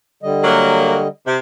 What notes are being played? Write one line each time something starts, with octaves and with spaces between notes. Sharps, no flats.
D3 G3 D#5
F#3 A#3
C3